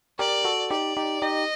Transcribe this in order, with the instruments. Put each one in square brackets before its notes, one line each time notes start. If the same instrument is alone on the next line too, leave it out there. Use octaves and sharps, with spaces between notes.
[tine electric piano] G4 A#4 [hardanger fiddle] D5
[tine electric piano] F#4 A4
[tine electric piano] D#4 G4 [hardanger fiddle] D5
[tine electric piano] D#4 G4
[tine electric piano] D#4 G4 [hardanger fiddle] D#5